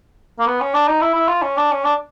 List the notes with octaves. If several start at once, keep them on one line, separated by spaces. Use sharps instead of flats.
A#3
B3
C#4
D4
D#4
E4
E4
F4
C#4
D4
C#4
D4